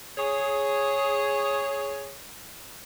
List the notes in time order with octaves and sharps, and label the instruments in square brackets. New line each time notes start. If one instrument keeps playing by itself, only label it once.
[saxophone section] G#4 C#5